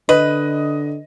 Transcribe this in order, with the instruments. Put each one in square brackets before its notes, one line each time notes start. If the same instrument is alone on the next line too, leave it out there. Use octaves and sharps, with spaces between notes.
[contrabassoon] D3 [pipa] B4 [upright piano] D#5